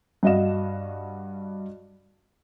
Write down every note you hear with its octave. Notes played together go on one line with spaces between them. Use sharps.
G2 F#4 D#5 F5 E7